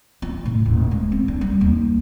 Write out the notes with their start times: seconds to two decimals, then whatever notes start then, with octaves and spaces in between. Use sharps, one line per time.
0.22 F4
0.45 A2
0.66 D#1
0.91 G#3
1.12 C4
1.28 D4
1.41 G3
1.61 D#2